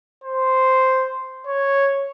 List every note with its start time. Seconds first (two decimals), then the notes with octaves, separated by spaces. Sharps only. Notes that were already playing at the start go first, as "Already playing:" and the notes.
0.24 C5
1.46 C#5